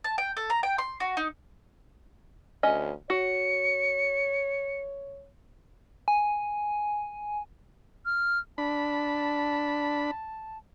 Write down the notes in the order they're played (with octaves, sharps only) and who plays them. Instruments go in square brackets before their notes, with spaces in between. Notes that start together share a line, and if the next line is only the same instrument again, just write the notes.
[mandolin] A5
G5
A4
A#5
G5
C6
F#4
D#4
[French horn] D2 [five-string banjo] C#4 D#5
[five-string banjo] F#4 [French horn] C#5 [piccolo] C#7
[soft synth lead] G#5
[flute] F6
[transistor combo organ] D4 B5 [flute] A5